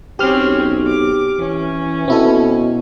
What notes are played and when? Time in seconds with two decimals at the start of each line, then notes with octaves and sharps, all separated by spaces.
0.19 B1 C4 C#4 G4 F6
0.87 D6
1.39 E3 C#4
2.08 B2 C4 E4 A4